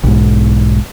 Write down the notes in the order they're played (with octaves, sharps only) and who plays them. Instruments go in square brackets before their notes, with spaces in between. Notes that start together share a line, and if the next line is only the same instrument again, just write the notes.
[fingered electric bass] B1 G#2